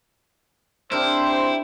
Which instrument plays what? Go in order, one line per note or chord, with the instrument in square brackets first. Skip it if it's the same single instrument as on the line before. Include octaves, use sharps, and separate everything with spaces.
[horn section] C4 G4 C5 [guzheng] D4 A#4 [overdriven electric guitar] E4